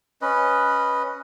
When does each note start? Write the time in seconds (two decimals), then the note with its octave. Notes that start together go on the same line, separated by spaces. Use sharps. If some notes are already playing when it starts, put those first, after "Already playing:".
0.22 C#4 B4 D#5